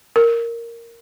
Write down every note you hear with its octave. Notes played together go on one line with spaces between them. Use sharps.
A#4